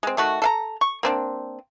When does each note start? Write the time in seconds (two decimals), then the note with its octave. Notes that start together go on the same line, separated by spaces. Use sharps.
0.03 G#3 C4
0.17 D#3 A3 F#4
0.42 A4 F5 A#5
0.81 C#6
1.03 A#3 C4 D4